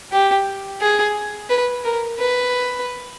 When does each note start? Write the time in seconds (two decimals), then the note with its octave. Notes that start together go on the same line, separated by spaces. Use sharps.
0.12 G4
0.81 G#4
1.50 B4
1.84 A#4
2.19 B4